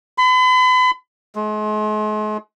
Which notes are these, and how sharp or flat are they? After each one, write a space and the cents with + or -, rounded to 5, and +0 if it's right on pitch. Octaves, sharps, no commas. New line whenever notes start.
B5 +40
G#3 +40